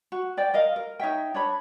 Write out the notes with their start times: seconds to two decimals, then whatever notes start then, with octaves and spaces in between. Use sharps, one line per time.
0.12 F#4
0.37 C5 D5 G5
0.54 A#4 D#5 F5
0.76 A#4
1.00 D#4 C#5 E5 G5
1.34 D4 C#5 B5